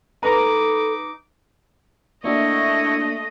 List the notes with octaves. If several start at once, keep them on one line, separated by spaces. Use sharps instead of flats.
D#4 A4 B4 A#5 D6
A3 A#3 D4 E4 F#4 D#5 C#6